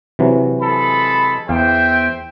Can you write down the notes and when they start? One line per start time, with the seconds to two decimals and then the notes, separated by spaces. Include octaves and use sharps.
0.19 C3 E3 F#3
0.62 G#3 A4 B5
1.49 E2 C5 E5 F5 G5